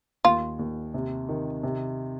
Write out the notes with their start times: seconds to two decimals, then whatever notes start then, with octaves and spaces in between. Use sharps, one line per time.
0.24 D#2 F4
0.59 D#2
0.94 C3
1.29 D#3
1.63 C3